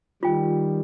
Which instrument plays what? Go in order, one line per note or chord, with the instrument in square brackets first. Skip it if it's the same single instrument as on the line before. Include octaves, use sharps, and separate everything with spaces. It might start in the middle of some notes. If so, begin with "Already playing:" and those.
[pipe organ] D#3 G3 [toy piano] F4 G5